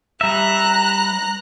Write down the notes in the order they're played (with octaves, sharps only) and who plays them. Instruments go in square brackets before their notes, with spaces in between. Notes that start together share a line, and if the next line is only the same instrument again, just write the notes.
[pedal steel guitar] G3 E5 [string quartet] A#5 F#6